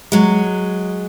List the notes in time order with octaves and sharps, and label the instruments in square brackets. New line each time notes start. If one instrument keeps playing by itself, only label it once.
[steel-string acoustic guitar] F#3 G#3